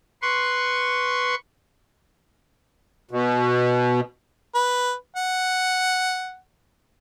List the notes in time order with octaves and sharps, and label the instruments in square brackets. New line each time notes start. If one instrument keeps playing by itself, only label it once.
[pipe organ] B4 C6 C#6
[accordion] B2
[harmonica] B4
F#5